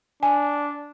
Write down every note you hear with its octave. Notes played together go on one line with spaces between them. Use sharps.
D4 G#5